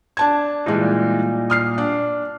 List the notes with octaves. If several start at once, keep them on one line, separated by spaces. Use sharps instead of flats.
D4 A5 G#6
A#2 E3 G3 G#3 D#4
D#6 F6 C7
D4